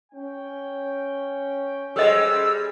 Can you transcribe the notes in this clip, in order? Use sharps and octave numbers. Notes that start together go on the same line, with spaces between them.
C#4 G5
G3 G#3 A4 C5 D#5 E6